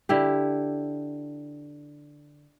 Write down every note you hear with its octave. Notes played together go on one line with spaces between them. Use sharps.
D3 E4 G4